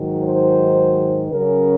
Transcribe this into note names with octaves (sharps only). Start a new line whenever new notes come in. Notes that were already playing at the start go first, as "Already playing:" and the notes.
Already playing: G#2 D#3 F#3
C5
C#3 F#3 C#4 A#4